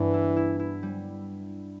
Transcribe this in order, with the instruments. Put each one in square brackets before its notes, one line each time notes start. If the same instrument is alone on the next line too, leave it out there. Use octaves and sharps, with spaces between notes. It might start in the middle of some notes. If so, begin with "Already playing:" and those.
Already playing: [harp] G2 B3 D4 [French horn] E3
[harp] E4
E4
E4
G3